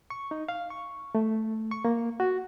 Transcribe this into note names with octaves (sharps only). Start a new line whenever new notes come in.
C#6
D#4
F5
C#6
A3
C#6
A#3
F#4